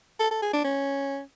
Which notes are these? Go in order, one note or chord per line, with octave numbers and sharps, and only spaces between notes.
A4
A4
G#4
D4
C#4